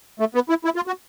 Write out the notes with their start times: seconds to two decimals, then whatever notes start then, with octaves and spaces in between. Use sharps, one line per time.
0.20 A3
0.35 B3
0.49 E4
0.65 E4
0.76 F4
0.87 F#4